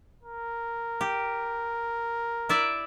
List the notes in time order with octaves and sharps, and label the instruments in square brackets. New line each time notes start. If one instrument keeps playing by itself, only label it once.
[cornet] A#4
[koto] G4
E4 D5 E5